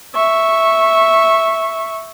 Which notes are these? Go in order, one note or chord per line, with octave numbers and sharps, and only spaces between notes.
E5 C#6